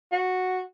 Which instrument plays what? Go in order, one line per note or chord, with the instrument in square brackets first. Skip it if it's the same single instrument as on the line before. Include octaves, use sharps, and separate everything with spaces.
[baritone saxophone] F#4